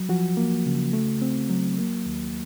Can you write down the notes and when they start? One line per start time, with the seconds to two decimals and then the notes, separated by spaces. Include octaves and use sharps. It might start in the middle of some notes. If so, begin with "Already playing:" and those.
Already playing: F#3
0.09 F3 F#4
0.37 A#3
0.66 C#3
0.93 A3
1.22 C4
1.50 F#3
1.78 A#3
2.06 D#2